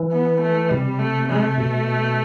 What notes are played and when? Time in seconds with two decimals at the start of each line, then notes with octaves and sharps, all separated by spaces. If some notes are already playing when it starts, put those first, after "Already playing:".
Already playing: E3
0.12 B3
0.41 A3
0.71 C3 G3
0.99 A3
1.29 A3
1.58 B2